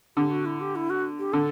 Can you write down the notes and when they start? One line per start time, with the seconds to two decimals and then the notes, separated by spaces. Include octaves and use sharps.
0.17 D3 G4
0.31 F#4
0.46 E4
0.61 G4
0.76 E4
0.90 F#4
1.19 G4
1.33 D3 A4